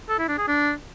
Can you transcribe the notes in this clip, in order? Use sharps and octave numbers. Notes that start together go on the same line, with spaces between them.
A4
E4
D4
G#4
D4